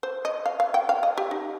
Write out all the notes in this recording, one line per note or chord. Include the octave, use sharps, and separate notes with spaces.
C5
D#5
F5
F5
G5
F5
D#5
G4
D#4